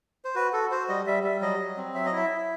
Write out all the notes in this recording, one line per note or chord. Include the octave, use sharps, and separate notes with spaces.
C5
F#4 B4
F#4 A4
F#4 C5
G3 D#5
G3 E5
G3 E5
F#3 D#5
F#3
C4
F#3 E5
D#5
E4 E5
E4